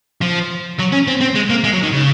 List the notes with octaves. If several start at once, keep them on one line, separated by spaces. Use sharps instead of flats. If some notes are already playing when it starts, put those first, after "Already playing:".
F3
F#3
C#4
C4
C4
G#3
A#3
G#3
F#3
D#3
C#3